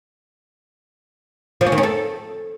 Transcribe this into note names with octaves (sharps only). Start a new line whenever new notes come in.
F3
C#4
D#3
C#4
A4